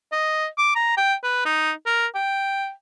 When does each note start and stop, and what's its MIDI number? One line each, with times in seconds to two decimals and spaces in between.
0.12 0.47 75
0.58 0.75 86
0.75 0.96 82
0.97 1.14 79
1.23 1.42 71
1.45 1.72 63
1.86 2.06 70
2.15 2.71 79